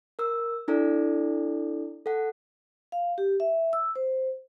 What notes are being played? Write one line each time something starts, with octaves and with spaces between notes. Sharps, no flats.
A#4 E6
D4 E4 A4 D5
A4 F#5
F5
G4
E5
E6
C5